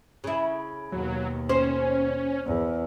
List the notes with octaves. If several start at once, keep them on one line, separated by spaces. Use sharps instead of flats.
C#3 E4
D#2 B2 F#3
C#4 C5
E2